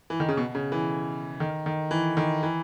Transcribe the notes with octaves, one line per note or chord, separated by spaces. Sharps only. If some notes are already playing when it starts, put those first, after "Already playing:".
E3
D#3
C#3
B2
C#3
E3
D#3
D#3
E3
D#3
E3